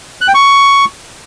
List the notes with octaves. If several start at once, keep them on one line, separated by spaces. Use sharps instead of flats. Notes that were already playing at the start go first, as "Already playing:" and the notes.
F#6
G5
C#6